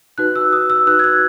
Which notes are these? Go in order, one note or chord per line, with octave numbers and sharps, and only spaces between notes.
D#4 F#4 B4 F#6
E6
D#6
E6
D#4 F#4 B4 F#6
G#6
F#6